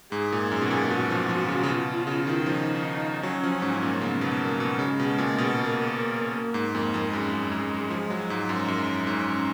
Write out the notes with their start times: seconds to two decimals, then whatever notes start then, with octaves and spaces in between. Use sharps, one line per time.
0.12 G#2 G#4
0.32 A#2
0.52 F#2
0.62 B2
0.70 A#2
0.90 B2 F#4
1.10 F3
1.29 F3
1.48 C#3
1.63 C#3
1.68 B2 F4
2.07 C#3
2.27 D#3
2.46 F3 D#4
3.23 F#3 C#4
3.44 F3
3.62 G#2
3.83 A#2
4.02 C#3 B3
4.21 B2
4.41 A#3
4.60 B2
4.79 C#3 G#3
4.99 B2
5.18 A#2
5.38 B2
5.57 A#3
6.35 A#3
6.54 G#2
6.74 F2 A#3
6.94 F2
7.13 F#2 G#3
7.32 F#2
7.52 F#2
7.90 F3
8.10 F#3
8.30 G#2
8.49 F#2
8.68 F#2
9.07 G#2 C#4